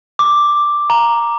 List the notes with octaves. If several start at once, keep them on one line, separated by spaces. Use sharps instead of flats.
D6
A#5